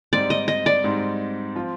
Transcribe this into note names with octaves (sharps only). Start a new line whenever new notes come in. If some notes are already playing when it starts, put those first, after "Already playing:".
G#2 G3 C4 D#4 D5
D#5
D#5
D5
G#2 G3 C4 D#4
F3 C4 F4